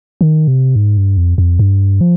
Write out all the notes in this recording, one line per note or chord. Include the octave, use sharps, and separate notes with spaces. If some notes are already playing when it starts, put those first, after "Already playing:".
D#3
C3
G#2
G2
F2
F2
G2
F3